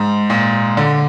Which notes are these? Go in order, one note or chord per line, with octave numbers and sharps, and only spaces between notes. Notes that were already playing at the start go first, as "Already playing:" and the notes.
Already playing: G#2
A#2
D3